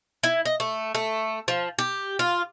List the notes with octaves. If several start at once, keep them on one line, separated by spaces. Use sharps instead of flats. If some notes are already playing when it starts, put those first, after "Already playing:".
E4
D#5
A3
A3
F3
G4
F4